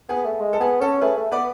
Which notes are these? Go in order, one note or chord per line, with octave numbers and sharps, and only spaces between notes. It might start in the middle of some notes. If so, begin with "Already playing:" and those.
B3 G#4 B4
A3
G#3
A4
B3 G#4
C#4 A4
A3 G#4 B4
A3
B3 B4 D5